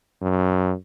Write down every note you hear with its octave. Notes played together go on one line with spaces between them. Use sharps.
F#2